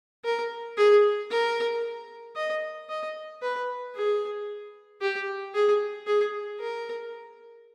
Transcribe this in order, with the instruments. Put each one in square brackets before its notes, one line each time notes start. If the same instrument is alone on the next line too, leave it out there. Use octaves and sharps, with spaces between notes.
[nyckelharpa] A#4
G#4
A#4
D#5
D#5
B4
G#4
G4
G#4
G#4
A#4